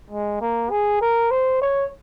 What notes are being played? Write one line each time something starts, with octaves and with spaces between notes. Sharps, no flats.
G#3
A#3
G#4
A#4
C5
C#5